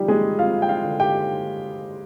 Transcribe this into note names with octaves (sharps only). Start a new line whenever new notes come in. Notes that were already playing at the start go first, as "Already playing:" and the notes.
Already playing: D3 F3 G3 D#4 G4
G#3 G#4
C4 F4 F5
G5
F4 F5
D3
G4 G5